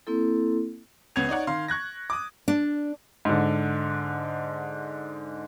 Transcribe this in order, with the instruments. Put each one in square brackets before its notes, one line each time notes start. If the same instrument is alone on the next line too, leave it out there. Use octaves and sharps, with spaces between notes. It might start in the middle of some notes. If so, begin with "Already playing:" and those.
[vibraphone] A#3 C4 E4 A4
[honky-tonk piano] C#2 B3 C#4 G#6 F7
D#4 C#5 D5 F#5
D#3 F5 C6
C#6 F#6 G#6 A#6
D6 D#6
[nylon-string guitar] D4
[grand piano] G#2 D3